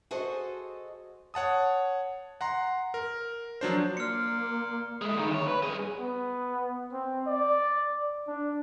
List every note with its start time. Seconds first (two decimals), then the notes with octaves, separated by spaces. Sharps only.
0.11 F#4 G#4 A4 C5 D#5
1.34 C#5 F#5 A5 D#6
2.41 F#5 A#5 C6
2.94 A#4
3.61 F3 F#3 D4 C5
3.97 A#3 D5 C6 F6 C#7
5.02 G#3 A3
5.17 G2 D#3
5.30 D2 C#5
5.48 B4
5.62 G2 G#4
5.99 B3
6.93 C4
7.27 D5
8.28 D4